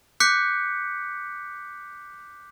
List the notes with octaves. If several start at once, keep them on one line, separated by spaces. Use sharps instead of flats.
D6 F#6 G6 B6 C#7